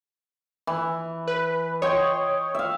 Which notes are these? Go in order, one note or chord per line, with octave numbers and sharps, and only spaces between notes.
E3
B4
C#5 D#5 G5 C6
E5 F5